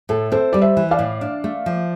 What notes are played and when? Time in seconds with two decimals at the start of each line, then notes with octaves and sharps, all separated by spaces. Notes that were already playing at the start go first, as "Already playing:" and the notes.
0.09 A2 A4
0.32 C4 A4 C5
0.53 G3 D5
0.62 C5 E5
0.77 E3
0.91 D5 F5
0.99 A2
1.21 D4
1.44 A3
1.66 F3